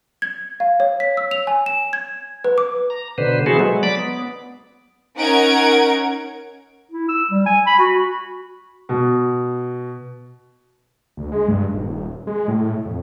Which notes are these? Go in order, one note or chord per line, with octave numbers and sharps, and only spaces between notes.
G#6
F5
C#5
B6
E6
F7
G#5
E7
G#6
B4
D6
A#5
B2 D3 B4 C5
E3 B3 F#4 G#4 A4 C5
F#3 G#3
D5 B5 D6
B3
C#4 D#4 A#4 F#5 G#6 D7
E4
E6
G3
G#5
B5
F#4
B2
D2
G#3
G2
D#1
G#3
A2
F2